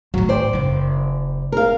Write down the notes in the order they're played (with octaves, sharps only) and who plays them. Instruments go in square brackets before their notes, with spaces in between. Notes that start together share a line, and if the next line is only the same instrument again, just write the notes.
[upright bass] A2 D#3 [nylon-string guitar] F#3
[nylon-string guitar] C5 D5 G5
[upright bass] F#1 D#4
[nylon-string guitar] A#4 F5